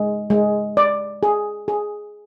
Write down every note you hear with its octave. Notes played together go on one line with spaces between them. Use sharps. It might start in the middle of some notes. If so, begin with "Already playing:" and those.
Already playing: G#3
G#3
D5
G#4
G#4